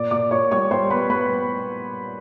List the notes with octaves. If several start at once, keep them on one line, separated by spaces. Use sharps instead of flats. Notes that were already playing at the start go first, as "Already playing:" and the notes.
Already playing: A#2 D5 D6
A#2 D5 D6
A#2 C#5 C#6
G3 C#5 C#6
G3 C5 C6
B3 B4 B5
G3 B4 B5